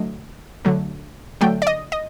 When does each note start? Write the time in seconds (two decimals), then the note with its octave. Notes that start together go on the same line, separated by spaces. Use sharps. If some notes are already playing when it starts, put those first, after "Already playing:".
Already playing: D3 F#3 A3 D#5
0.65 D3 F#3 A3
1.41 D3 F#3 A3 G5
1.62 D5
1.67 D#5
1.92 D#5